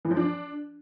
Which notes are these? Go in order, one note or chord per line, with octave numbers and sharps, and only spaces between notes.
E3
F3
D4